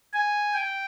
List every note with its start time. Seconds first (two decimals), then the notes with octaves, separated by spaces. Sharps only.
0.13 G#5
0.54 G5